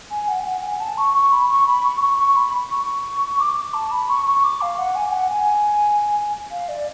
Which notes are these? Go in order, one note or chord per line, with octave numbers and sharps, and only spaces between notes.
G#5
F#5
G#5
F#5
G#5
A5
C#6
C#6
B5
C#6
B5
C#6
C#6
C#6
B5
C#6
D6
D6
A5
B5
C#6
C#6
D6
F5
F#5
G#5
G#5
F#5
G#5
F5
D5